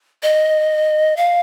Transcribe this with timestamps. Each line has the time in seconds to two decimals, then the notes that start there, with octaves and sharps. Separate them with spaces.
0.23 D#5
1.17 F5